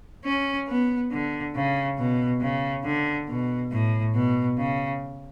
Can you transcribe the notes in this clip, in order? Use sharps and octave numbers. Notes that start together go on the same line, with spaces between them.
C#4
B3
D3
C#3
B2
C#3
D3
B2
A2
B2
C#3